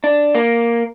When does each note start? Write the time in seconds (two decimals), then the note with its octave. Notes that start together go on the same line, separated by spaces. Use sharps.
0.04 D4
0.35 A#3